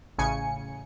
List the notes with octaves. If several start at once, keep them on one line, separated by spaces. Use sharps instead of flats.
A1 C#3 G#5 C#7